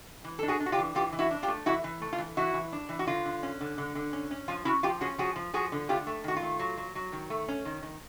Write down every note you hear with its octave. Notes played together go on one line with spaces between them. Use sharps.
E3
D4 A4
F#4 G#4
D4
F#4
F4 G4
E3
E3 F4 G4
E3
E4 F#4
D4
F4 G4
A3
E3 E4 F#4
E3
A3
F4
E3
E3 E4 F#4
E3
D4
E3
F#4
D3 F4
D3
C#4
D3
D3
D3
C#4
C#4
F3 F4
C#4 E4 F#4
F3 F4 G4
C#4 F#4 G#4
F3 F#4 G#4
F3
F3 F#4 G#4
D3
A3 F4 G4
A3
D#3 F#4
F4
A3
F#3
F#3
F#3
D#3
A3
C#4
D#3
D#3